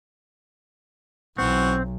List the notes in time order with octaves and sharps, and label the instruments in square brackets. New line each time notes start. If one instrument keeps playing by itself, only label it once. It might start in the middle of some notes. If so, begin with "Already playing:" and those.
[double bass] B1 [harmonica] E3 F#5 C#6 [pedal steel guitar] C4